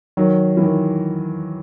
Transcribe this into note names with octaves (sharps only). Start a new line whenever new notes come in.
D#3 F#3
E3
D#3